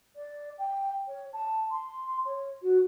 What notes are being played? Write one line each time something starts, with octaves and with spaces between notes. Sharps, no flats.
D5
G5
C#5
A5
C6
C#5
F#4